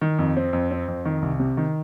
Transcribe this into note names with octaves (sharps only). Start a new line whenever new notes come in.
D#3
F2
C4
F2
C4
F2
D#3
C2
C3
D#3